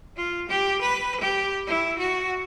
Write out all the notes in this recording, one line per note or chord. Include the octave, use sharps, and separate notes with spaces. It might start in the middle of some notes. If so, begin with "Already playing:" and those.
F4
G4
B4
G4
E4
F#4